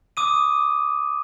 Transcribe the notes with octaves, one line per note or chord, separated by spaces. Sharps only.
D6 D#6 D#7